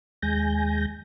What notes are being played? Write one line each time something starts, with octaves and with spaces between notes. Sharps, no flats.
D#2 G#3 G#5 G6 A#6